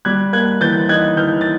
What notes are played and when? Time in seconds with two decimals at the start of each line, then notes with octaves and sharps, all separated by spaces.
0.05 G3 F#6 G#6
0.33 A#3 F#6 G#6
0.61 E3 G6 A6
0.89 D#4 F#6 G#6
1.17 E3 F6 G6
1.41 A6